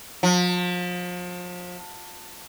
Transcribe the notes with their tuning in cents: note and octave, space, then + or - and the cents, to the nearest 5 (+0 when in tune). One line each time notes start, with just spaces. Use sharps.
F3 +35